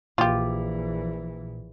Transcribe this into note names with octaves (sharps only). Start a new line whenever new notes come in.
A#1 A#2 E3 F4 G4